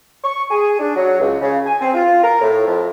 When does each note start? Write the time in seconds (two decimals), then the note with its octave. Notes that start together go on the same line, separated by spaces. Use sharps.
0.23 C#6
0.51 G#4
0.79 D4
0.96 F#3
1.20 C#2
1.41 C#3
1.65 G#5
1.81 C4
1.94 F4
2.23 A#4
2.41 A2
2.66 F2